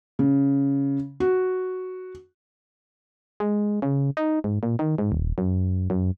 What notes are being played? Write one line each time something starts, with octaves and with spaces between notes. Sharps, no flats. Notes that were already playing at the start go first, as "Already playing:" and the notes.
C#3
F#4
G#3
C#3
D#4
G#2
A#2
D#3
G#2
D#1
F#2
F#2